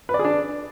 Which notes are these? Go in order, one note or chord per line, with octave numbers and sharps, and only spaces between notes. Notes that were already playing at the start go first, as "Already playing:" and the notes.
B4
D5
G#4
D4